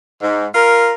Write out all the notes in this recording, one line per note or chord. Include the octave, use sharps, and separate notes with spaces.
G#2
F4 A#4